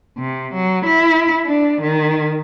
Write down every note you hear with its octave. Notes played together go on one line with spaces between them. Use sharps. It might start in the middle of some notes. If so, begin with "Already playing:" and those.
C3
F#3
E4
D4
D#3